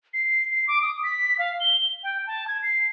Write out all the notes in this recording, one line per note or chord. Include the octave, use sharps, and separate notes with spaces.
C7
C7
D6
D#6
B6
F5
G7
G5
A5
G#6
C7